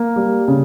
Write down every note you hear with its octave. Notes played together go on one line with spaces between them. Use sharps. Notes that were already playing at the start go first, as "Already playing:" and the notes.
Already playing: A#3
G3
C#3